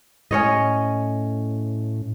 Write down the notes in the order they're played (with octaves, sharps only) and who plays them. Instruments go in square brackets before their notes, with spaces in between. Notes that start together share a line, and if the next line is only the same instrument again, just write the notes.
[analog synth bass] A2 [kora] C#4 C#5 D#5